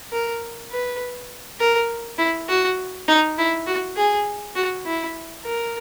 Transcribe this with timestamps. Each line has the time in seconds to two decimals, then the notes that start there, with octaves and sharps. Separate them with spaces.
0.12 A#4
0.71 B4
1.60 A#4
2.18 E4
2.49 F#4
3.08 D#4
3.38 E4
3.67 F#4
3.97 G#4
4.56 F#4
4.86 E4
5.44 A#4